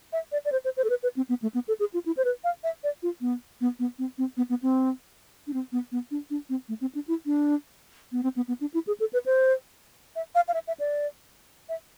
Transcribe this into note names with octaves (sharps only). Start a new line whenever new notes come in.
E5
D5
D5
C5
C5
C5
A4
B4
B4
C4
B3
A3
B3
A4
G#4
F4
E4
C5
B4
F5
E5
D5
F4
B3
B3
B3
C4
C4
B3
B3
C4
D4
C4
B3
B3
D4
D4
C4
A3
C4
D4
E4
D4
B3
C4
B3
B3
D4
E4
G#4
A4
B4
C5
E5
F5
F5
E5
E5
D5
E5